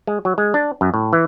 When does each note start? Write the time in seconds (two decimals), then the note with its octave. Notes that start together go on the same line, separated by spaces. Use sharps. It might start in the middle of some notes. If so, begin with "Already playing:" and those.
0.07 G#3
0.25 F#3
0.38 G#3
0.54 D4
0.81 F#2
0.94 A2
1.13 E3